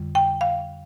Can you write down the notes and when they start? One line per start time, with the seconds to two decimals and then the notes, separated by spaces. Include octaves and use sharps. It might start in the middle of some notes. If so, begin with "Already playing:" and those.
Already playing: F2 D3 G3
0.15 G5
0.41 F5